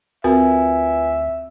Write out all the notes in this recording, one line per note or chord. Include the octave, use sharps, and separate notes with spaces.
D2 C4 F4 F#4 A#4 B4 E5 G#5